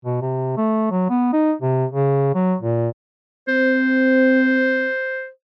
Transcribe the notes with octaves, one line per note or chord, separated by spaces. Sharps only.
B2
C3
A3
F#3
B3
D#4
C3
C#3
F#3
A#2
C4 C5